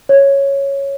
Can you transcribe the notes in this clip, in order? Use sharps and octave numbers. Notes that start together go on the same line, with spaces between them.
C#5